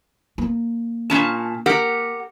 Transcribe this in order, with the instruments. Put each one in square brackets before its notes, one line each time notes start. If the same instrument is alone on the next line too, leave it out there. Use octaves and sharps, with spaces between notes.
[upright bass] A#3
[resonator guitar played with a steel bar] A#2 C#4 A5
G4 A#4 F#5